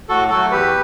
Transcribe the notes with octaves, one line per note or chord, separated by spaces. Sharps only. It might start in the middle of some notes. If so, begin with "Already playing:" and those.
A2 F#4 A4
F#3 A3 F#4 A4
E2 G4 B4